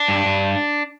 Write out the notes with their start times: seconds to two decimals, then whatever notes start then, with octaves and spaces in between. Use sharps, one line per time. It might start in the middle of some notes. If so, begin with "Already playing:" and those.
Already playing: D4
0.08 G2
0.26 G2